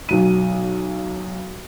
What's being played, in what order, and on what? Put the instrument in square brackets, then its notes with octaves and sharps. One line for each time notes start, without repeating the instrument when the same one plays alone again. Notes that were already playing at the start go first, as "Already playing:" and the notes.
[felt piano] B1 F#3 D#7